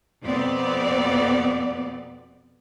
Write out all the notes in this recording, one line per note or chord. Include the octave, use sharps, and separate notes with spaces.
F2 B2 B3 C4 D5